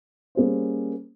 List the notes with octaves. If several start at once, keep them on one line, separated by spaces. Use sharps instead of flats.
G3 A#3 C#4 G#4 C5